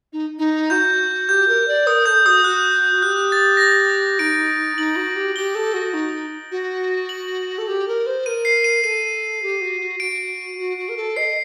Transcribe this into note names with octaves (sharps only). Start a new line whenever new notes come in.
D#4
D#4
F#4 G6
G4 G6
A#4
D5
A#4 D#6
A4 G6
F#4 D#6
F#4 F#6
F#4
G4 F#6
A6
A#6
A6
D#4 D7
D#4 F#7
F#4
G4
G4 G7
A4
F#4
D#4
F#4
F#7
A4
G4
A#4
C5
A#4 D#7
C7
D#7
A4 D#7
G4
F#4
F#4
F#4 D7
F#4
F#4
A#4
A4
D#5 C7